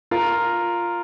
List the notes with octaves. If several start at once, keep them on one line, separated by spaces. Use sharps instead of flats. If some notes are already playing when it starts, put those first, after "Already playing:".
F4 A#4